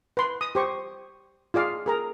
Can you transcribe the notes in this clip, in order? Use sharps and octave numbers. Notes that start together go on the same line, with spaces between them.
B4 C6
D#6
G4 C5 C#6
F4 G#4 D5 F5
G#4 A#4 A#5